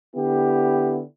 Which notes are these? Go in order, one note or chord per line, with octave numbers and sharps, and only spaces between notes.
D3 B3 E4 G4